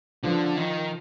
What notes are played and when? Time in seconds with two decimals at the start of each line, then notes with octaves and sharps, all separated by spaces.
0.23 D3 F3
0.57 D#3